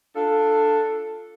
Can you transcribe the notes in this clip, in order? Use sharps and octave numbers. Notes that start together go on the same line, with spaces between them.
D4 F4 A4